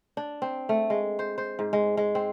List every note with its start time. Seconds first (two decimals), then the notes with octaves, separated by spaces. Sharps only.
0.17 D4
0.42 C4
0.69 A3
0.90 G#3
1.19 C5
1.38 C5
1.59 G#2
1.73 G#3
1.97 G#3
2.15 C4